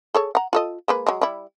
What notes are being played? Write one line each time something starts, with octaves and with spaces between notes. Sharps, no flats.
G#4 A4 C#5
F#5 A#5
F4 A4 D#5
G#3 A#3 B4
F#3 G#3
G3 E4